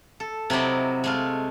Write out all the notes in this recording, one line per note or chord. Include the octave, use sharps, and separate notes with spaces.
A4
C3 F#3 E4 D5 D#5
G#3 A3 F4